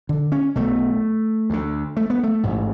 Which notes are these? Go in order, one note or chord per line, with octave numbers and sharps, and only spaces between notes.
D3
C#4
B1 B2 A3
D2 D3
A3
B3
A3
A1 G#2